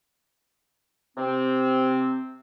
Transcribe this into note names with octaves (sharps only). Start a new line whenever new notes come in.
C3 C4